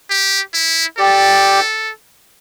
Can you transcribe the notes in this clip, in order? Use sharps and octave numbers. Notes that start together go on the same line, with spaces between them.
G4
E4
G4 A4 D5 G5